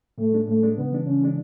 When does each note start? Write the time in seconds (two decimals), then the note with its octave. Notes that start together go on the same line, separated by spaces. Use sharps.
0.18 A2 A3
0.33 G#3 D4
0.48 A2 A3
0.63 G#3 D4
0.77 C#3 B3
0.92 E3 G#3 D4
1.07 C#3 C#4
1.21 E3 G#3 D4